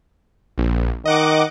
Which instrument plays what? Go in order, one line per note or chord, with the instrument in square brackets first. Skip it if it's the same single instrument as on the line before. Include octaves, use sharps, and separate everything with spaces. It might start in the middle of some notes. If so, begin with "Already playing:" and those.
[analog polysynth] A#1
[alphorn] D#3 [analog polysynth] D#5 F#5 D6